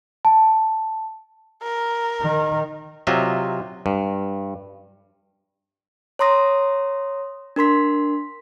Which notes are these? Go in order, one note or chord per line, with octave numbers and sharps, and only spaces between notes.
A5
A#4
D#3
C3 F#3 F4 D#5 E5
G2
C#5 A#5 C6 D#6 A#6
D4 A#4 C6 B6